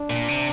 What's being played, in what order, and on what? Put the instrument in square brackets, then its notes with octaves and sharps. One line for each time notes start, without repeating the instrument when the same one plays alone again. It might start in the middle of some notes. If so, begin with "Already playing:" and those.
Already playing: [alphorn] D4
[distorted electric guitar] A#2
C3